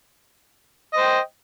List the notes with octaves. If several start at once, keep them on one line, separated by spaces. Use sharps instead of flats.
C5 D#5 G5